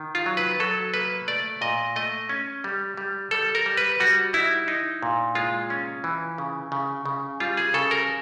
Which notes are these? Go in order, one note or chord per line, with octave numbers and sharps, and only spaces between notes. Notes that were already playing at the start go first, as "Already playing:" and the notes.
Already playing: D#3
F4
F#3
B4
F#3 A4
A#3 B4
A3 D5
A#2 D#5
A3 D#5
C#4
G3
G3
G3 A4
A#4
G3
B4
G3 F#4
D#4 E4
D#4
A#2
G#3 F4
C#4
E3
C#3
C#3
C#3
G3 F4
G#4
C#3 A4
A#4